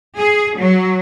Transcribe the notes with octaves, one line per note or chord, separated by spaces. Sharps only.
G#4
F#3